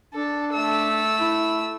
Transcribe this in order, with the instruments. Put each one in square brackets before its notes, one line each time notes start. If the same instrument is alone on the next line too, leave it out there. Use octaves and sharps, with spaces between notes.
[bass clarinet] D4 [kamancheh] A4
[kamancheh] A3 E6
[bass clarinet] E4